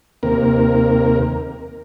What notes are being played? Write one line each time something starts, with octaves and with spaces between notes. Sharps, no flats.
D#2 C3 A#3 A#4